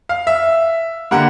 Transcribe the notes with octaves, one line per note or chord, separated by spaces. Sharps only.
F5
E5
D3 G3 A#3 F#5